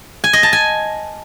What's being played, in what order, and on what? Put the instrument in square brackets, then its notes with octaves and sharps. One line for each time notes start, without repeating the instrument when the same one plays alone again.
[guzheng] G#5
D#5
A5
G#5